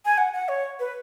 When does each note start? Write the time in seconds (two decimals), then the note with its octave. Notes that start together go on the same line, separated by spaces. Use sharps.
0.05 G#5
0.18 F#5
0.33 F#5
0.48 C#5
0.79 B4